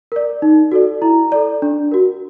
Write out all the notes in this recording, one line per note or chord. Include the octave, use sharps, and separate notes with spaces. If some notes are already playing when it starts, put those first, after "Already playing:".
A#4 D5
D#4
F#4 A4 D5
E4 A#5
A4 D5
D4
F#4 A#4